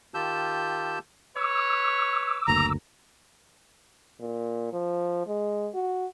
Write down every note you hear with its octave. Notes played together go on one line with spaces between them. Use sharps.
D#3 F4 G4 A5 E6 G6
B4 C#5 D6 E6
F#1 D2 A#3 A#5
A#2
F3
G#3
F#4